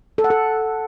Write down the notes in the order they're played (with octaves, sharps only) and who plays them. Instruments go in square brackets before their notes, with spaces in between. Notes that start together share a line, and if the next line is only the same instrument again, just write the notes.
[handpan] A4
F#5
A4